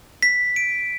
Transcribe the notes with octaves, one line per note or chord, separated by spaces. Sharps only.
B6
D7